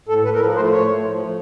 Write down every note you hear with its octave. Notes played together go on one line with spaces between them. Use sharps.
A2 A4
A2 B4
A#4
F3 B4
A3 C5
A2 C#5
A2
F3
A3